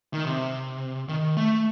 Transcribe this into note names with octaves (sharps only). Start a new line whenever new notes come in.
D#3
C3
D#3
A3